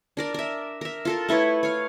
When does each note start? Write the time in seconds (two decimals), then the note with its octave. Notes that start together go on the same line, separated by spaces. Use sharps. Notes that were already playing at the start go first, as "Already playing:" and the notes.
0.17 D4 A#4 D5
0.34 A#4 E5
0.81 A#4 E5
1.05 F4 A4 A#4
1.29 A3 E4 B4 C#5
1.63 C#5 F5